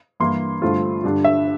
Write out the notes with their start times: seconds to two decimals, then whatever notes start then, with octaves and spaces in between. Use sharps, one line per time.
0.20 G2 E3 A#3 E4 C6
0.62 G2 D3 A3 C4 F4
1.04 G2 D3 G3 D4
1.24 E5